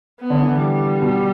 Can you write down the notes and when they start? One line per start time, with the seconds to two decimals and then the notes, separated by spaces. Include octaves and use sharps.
0.20 B3
0.30 D3
0.41 E3
0.61 G3
1.02 B2